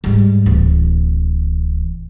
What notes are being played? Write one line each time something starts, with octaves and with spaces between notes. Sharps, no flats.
G#2 G3
D1 E3